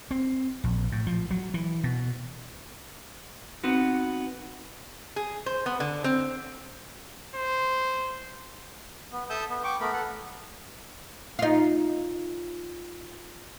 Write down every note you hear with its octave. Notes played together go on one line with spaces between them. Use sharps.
C4
A#1
A2
F3
F#3
E3
B2
B3 C4 D#4 F#4
G#4
C5
B3
D3
C4
C5
B3
A4 E5 A5 D#6 E6 G6
B3
G5 C#6 D6
A3 B3 A#4 B5
A4 F#5
D#4 F4